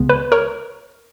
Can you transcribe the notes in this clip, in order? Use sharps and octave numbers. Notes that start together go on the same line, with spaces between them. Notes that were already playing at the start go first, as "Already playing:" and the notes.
Already playing: C#2 C#3 G#3 B3
B4
A#4 C#5